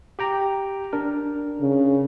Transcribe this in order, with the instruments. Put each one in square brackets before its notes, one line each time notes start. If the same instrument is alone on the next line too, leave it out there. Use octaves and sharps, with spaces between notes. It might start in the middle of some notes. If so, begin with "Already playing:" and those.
[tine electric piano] G4 G5 A#5
D4 A#4
[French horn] C#3